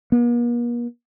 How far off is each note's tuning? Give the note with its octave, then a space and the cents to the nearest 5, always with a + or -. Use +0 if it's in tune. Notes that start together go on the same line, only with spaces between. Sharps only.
A#3 +45